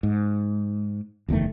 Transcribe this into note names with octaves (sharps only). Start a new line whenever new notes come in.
G#2
F#1 E2 D#3 A3